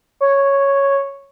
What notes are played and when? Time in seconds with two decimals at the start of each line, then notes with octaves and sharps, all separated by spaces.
0.21 C#5